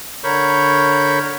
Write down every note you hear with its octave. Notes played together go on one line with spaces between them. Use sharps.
D3 A#4 C#5 B5 C#6 G6